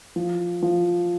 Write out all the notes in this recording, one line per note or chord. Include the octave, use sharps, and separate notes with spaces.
F3
F3